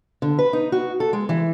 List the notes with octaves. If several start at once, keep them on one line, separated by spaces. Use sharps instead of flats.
D3
B4
D#4
F#4
A4
G#3
E3